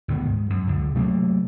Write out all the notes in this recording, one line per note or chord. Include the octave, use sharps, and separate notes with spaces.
D2 A#2 D#3 B3
G#2
F#2
C#2 D3
C3 F#3 A3 A#3